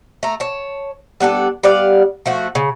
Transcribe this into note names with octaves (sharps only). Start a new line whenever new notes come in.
A3 A#5
C#5 A5
G3 B3 D4 A4
G3 B3 D5 F5
F3 A3 F#4
C#3